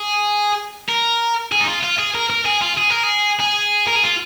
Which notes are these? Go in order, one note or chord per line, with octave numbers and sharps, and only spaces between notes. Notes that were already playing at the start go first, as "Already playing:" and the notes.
Already playing: G#4
A#4
G#4
D#4
F4
F4
G#4
A#4
A#4
G#4
F4
G#4
A#4
G#4
G#4
A#4
G#4
F4